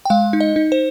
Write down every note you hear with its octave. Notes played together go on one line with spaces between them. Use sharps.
G5
G#3 F5
D#4
D#5
D#4
C5